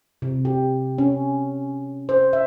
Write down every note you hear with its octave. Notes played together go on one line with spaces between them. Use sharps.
C3
G4
C#4
C5
E5